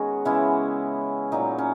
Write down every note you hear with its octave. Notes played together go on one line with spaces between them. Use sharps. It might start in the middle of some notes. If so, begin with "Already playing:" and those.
Already playing: D#3 G#3 B3 C#4 F#4 G#4
C#3 E3 G#3 B3 C#4 E4
A#2 F#3 A#3 D#4
C#4